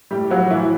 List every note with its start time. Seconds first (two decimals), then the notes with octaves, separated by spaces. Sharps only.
0.11 A2 G3 G4
0.30 F3 F#3 F#4
0.50 A2 E3 E4